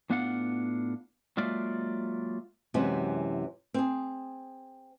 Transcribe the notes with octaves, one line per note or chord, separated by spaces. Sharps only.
A2 B3 D4 F4 F5 F#5
F#3 G#3 A#3 F4 D5 E5
F#2 C3 E3 G#3 C4 F#4
C4 G#4